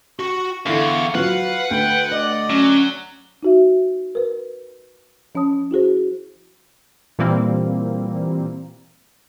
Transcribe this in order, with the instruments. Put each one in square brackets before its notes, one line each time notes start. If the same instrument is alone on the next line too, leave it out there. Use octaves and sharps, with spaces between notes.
[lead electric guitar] F#4 [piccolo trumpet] C#6
[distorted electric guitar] E2 [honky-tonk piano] D3 E4 A4 [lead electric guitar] F5 [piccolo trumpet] C#6
[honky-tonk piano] F3 F#3 [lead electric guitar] B4 [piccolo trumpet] F5 [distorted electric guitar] F#5
[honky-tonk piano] D2 [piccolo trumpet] G5
[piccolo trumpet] D5 [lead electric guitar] D#5
[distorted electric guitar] F#3 [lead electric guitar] C#4
[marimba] D#4 F#4 E5
A#4 B4
F3 C#4 C#5 A5 D#6
E4 F#4 G#4 C5
[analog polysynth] A#2 E3 G3 A#3 C4